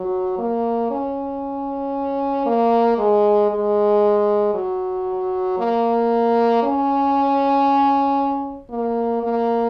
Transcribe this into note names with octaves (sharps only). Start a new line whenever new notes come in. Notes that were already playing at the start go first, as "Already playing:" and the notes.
Already playing: F#3
A#3
C#4
A#3
G#3
G#3
F#3
A#3
C#4
A#3
A#3